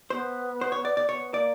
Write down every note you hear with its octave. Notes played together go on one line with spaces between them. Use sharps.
B3 C5
C5
C#5
D5
D5
B3 C#5
A#3 D5